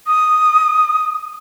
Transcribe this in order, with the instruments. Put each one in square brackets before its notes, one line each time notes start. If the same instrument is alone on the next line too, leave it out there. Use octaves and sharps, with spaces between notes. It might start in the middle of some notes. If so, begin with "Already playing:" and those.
[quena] D#6